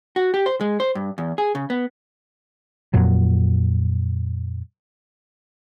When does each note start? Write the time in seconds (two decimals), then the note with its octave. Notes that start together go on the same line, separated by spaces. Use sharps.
0.16 F#4
0.34 G4
0.46 C5
0.61 G#3
0.80 C5
0.95 G2
1.18 E2
1.38 G#4
1.55 C#3
1.70 B3
2.94 F2 A#2 F#3